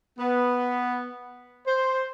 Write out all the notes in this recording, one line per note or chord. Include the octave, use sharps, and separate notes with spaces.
B3
C5